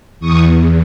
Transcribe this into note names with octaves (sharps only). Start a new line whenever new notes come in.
E2 C#6 D#6